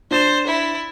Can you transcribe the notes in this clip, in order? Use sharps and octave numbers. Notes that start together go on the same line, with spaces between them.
D4 C5 A6 E7
E4